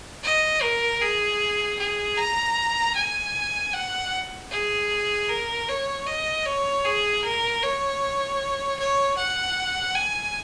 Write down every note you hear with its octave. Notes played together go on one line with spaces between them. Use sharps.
D#5
A#4
G#4
G#4
A#5
G#5
F#5
G#4
A#4
C#5
D#5
C#5
G#4
A#4
C#5
C#5
F#5
G#5